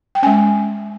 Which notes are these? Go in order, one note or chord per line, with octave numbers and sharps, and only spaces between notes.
G5
G#3 C#4 G#5